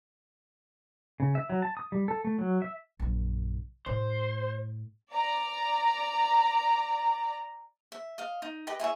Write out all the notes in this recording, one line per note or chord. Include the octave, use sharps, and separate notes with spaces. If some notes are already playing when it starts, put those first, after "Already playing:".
C#3
E5
F#3
A5
D#6
G3
A4
A3
F#3
E5
A#1 F#2
A2 C5
D5 A#5
E5
D#5 F5
D#4
G4 B4 D#5
E4 G#4 C#5 E5